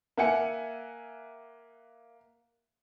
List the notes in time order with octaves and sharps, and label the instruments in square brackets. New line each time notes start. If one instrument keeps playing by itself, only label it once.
[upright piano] A#3 E5 F#5 G#5 C#7